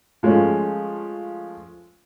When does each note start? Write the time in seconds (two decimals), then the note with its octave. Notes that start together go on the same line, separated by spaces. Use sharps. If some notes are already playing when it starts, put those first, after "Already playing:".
0.23 F3 G#3 A3 C#4